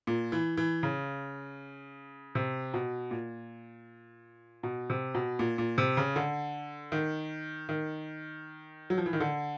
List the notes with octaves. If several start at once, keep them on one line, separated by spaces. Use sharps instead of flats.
A#2
E3
E3
C#3
C3
B2
A#2
B2
C3
B2
A#2
A#2
C3
C#3
D3
D#3
D#3
F#3
F3
E3
D#3
D3